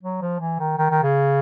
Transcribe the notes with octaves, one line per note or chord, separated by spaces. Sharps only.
F#3
F3
E3
D#3
D#3
D#3
C#3